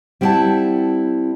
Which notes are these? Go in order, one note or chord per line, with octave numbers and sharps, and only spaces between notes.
G3 B3 C4 E4 F#5 A5